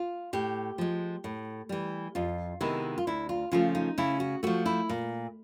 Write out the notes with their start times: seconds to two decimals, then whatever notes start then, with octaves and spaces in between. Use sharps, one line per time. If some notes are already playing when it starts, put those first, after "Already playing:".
Already playing: F4
0.33 A2 G4
0.78 F3 G#3
1.24 A2
1.69 E3 G3
2.15 F2 F4
2.61 C3 D#3 G#3 B3 E4
2.98 F4
3.07 D2 E4
3.29 F4
3.52 C#3 F3 A3 F4
3.75 D#4
3.98 C#3 E4
4.20 F#4
4.43 F3 A3 F#4
4.66 E4
4.89 A#2